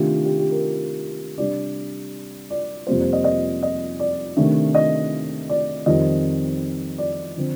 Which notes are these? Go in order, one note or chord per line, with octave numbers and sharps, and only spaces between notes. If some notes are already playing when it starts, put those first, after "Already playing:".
Already playing: C3 D#3 A3 D4 F4 G4
G4
G4
A#4
C3 G3 D4 D5
D5
F2 C3 G3 A#3 F4 C5
C5
D#5
D#5
D#5
D5
C3 D#3 A3 D4
D#5
D5
F2 D#3 G3 C4 D#5
D5
D3 F3 C4